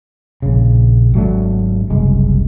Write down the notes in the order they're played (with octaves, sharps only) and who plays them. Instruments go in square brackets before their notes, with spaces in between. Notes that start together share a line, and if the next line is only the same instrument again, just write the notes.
[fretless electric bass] A#1 C#3
G#1 F#3 A3 D4
F#1 C2 G#3